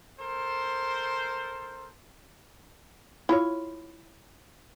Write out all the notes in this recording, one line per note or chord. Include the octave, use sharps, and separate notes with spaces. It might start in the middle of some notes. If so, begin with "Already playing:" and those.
A4 A#4 C5
E4 F4 C#5